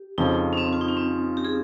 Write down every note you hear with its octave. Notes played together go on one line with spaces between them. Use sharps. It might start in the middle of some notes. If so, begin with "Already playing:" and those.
Already playing: G4
F2 C#3 F3 D#4
C#4
C4
F4
D#4
C#4
C4
G4
G#4